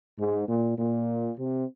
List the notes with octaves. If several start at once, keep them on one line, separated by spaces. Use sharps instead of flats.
G#2
A#2
A#2
C3